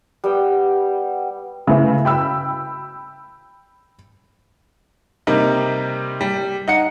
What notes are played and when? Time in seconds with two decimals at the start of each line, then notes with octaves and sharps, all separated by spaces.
0.24 G3 B3 G5
1.67 C#3 A3 E4 B4
2.05 G5 B5 E6
5.27 C3 G3 A#3 D#4
6.21 G3
6.68 D#4 F#5 C#7